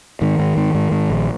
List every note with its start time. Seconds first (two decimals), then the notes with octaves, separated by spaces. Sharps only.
0.21 G#2 D#3
0.39 G#2
0.57 G#2
0.74 G#2
0.92 G#2
1.10 A#1